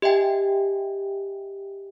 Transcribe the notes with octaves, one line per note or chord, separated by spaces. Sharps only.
G4 D#5 E5 G5 G#5